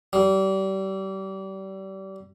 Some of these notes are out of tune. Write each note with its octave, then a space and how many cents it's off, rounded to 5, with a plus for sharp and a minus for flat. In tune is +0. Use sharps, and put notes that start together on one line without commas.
G3 -30